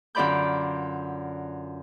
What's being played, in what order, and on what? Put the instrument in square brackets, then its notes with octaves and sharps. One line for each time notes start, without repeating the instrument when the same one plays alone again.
[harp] F#2 D3 F4 D5 B5 G6